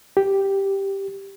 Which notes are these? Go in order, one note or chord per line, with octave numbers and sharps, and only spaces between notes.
G4